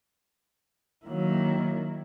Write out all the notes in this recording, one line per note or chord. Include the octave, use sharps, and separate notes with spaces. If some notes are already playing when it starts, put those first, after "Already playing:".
D#3 F#3 A#3 E4